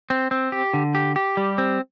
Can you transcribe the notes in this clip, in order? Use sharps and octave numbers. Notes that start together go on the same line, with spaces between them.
C4
C4
G4
D3
G4
G4
G3
C4